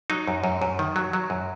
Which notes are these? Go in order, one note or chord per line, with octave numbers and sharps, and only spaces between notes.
F#3 D#4
F#2
F#2
F#2
D#3
F#3
F#3
F#2